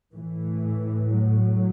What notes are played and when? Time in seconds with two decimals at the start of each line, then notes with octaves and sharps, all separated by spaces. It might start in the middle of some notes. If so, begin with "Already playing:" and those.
0.14 A2 E3
1.16 F#3